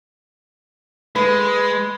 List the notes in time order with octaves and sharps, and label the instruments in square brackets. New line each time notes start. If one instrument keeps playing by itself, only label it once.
[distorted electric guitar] G#3 [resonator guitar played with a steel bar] B4